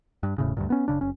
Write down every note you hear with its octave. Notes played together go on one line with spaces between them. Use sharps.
G2
E1 A2 C#3
D2 G2 A#2
B3 C#4
F#1 C2 C#3 D4
F#1 C#4